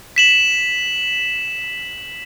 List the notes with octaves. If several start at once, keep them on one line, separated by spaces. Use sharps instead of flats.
B6 E7 F#7